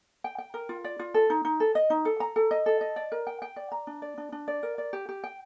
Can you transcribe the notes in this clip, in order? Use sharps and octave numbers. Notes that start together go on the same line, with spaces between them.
G5
G5
A#4
F4
D5
F4
A4
D#4
D#4
A4
D#5
D#4
A4
A#5
A4
D#5
A4
D#5
D5
A#4
G5
G5
D5
A#5
D4
D5
D4
D4
D5
A#4
D5
G4
G4
G5